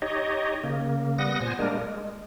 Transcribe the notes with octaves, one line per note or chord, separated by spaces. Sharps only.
D#4 G4 C#5 D#5
C#3 A#3
G3 B3 F#5 D#6 A#6
A#2 C5 G#5
G3 G#3 A#3 D4 A#4
G#3